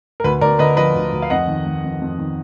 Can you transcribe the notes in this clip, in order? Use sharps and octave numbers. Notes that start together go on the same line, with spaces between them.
A#4
D2 B4
D2 A#4 D5
D3 B4 D#5
F3 B4 D#5
D2
D2
F5
F2 D#5 F#5
D#3
D#3
F2
F2
D#3